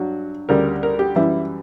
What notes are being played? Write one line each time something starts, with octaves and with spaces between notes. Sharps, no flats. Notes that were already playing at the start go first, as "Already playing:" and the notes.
Already playing: G2 F#3 F#4
D2 C#3 G3 A#4
A#4
G4
F#2 E3 G3 E4